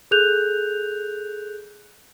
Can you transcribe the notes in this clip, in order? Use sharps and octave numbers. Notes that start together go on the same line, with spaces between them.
G#4 A4 F#6 G6 F7